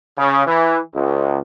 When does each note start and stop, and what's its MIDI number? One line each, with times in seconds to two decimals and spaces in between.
0.18 0.45 49
0.47 0.78 52
0.95 1.39 37